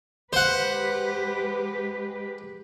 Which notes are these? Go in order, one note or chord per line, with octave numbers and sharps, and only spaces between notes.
G#3 G4 B4 C5 F#5